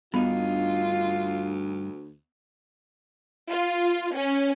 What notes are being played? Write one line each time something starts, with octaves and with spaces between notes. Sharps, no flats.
D2 G2 B3 D#4 F4
F4
C#4